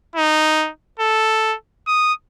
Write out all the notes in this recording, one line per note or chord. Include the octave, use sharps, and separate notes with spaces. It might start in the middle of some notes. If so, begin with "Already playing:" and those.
D#4
A4
D#6